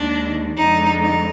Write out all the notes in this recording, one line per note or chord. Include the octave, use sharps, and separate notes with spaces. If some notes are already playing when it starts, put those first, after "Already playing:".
Already playing: D#2 D#3 G#3 D4
F2 D3 G#3 D#4
D#4